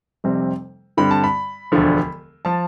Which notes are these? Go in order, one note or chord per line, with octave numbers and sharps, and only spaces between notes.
F1 F2 C3 G3 C4
G2 D3 G3 C4 B5
A5
B5
E1 D2 D3 F3
F3 A5